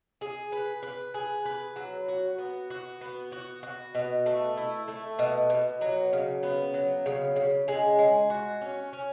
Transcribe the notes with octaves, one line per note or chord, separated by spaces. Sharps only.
G#4
B4
B4
G#4
B4
F#3
F#4
B3
F#4
B3
F#4
F#4
B2
A3
E4
A3
B2
B2
F#3
C#3
B3
F#3
C#3
C#3
G#3
G#3
F#4
C#4
C#4